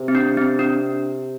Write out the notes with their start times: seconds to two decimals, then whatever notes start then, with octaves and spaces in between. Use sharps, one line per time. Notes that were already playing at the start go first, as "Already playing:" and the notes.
Already playing: C3
0.08 C4
0.15 D4
0.37 C4
0.59 D4